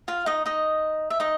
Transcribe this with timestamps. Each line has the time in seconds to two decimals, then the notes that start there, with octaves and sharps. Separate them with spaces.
0.08 F4 F5
0.26 D#4 D#5
0.46 D#4 D#5
1.10 E5
1.20 D#4 D#5